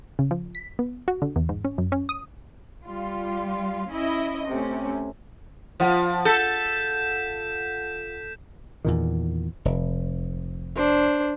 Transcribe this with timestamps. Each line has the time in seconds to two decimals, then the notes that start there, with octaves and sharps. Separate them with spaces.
0.19 C#3
0.31 F3
0.55 B6
0.79 B3
1.08 F#4
1.22 D3
1.36 E2
1.49 G#2
1.64 C#4
1.78 F#2
1.92 C#4
2.09 D#6
2.86 G3 F4
3.90 C#4 E4 D#5
4.48 C3 A3 C#4
5.80 F3 F4 F#5
6.25 A4 G6 B6 E7
8.85 E2 A#2 D#3
9.65 F1
10.76 D4 C5